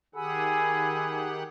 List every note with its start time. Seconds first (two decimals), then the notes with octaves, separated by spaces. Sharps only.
0.15 D#3 G4 G#4 F#5 G#5 B5 E6